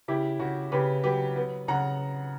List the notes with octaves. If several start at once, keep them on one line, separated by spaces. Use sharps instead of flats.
C#3 E4 G4
C#3 F#4
C#3 G4 B4
F#3 G4 B4
B3
C#3 F#5 A#5